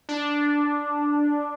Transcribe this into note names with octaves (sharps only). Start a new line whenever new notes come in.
D4